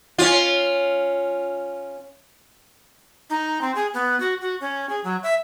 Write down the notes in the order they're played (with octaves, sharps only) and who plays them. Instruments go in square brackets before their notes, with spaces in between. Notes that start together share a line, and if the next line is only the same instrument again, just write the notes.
[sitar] C#4 F4
[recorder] D#4
C4
G#4
B3
F#4
F#4
C#4
G#4
F#3
E5